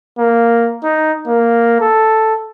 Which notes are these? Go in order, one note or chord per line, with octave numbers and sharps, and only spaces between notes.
A#3
D#4
A#3
A4